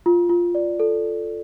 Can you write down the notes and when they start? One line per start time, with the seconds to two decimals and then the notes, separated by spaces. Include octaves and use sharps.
0.06 F4
0.30 F4
0.55 D5
0.80 A4